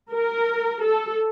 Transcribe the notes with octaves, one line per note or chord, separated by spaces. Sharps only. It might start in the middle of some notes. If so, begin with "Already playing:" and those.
A#4
A4